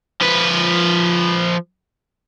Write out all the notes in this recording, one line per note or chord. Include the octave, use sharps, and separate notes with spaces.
F3 B4